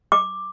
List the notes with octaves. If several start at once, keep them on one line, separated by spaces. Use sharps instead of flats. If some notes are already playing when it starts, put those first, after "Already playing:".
D6